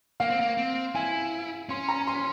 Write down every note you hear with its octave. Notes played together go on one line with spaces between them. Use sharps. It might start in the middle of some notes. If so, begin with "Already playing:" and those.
A#3 F5
C4
A#3
C4
E4 G#5
C#4 C6
A#5
C6